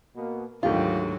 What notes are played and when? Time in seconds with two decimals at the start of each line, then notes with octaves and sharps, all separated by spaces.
0.15 B2 A#3
0.63 D2 G#2 D#3 F#3 F4 G4